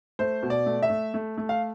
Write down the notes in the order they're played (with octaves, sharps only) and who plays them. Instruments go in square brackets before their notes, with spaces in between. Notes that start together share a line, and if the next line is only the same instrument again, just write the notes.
[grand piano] A3 C5
B2
D5
A3
E5
A3
A3
A3
F5